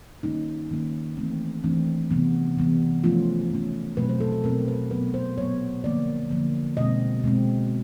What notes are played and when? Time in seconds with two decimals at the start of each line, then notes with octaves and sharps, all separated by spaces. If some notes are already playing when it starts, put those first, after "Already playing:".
0.23 D#3 G3 A#3 C#4 D#4
0.71 D#3 G3 A#3 C#4
1.17 E3 A3 C4
1.64 E3 A3 C4 D4
2.11 C3 E3 G3 B3
2.57 C3 E3 G3 B3
3.04 F3 A3 C#4 F4
3.50 F3 A3 C#4
3.97 B2 F#3 A3 C4 B4
4.09 C5
4.20 A4
4.32 A4
4.44 B2 F#3 A3 C4 A#4
4.68 B4
4.91 A#2 F#3 B3 B4
5.14 C5
5.38 A#2 F#3 B3 C#5
5.84 D3 F3 A#3 D5
6.30 D3 F3 A#3
6.77 B2 G#3 C4 D#5
7.24 B2 G#3 C4